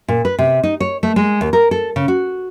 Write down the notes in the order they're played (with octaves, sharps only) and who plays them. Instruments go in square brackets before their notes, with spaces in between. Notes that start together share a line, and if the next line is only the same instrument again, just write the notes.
[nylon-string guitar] A#2
B4
C3
D#4
C#5
A3
G#3
D#2
A#4
A4
C#3
F#4